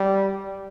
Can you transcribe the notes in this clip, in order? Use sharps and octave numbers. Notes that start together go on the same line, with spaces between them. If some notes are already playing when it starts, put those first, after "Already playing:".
Already playing: G3